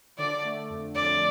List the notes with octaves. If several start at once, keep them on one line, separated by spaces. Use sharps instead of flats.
D3 D5
A3
F2
F2 D5